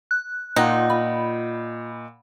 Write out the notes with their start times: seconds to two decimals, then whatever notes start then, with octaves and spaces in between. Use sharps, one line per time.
0.11 F#6
0.56 A#2 D#4 F4 F#5 G5
0.90 F4 B5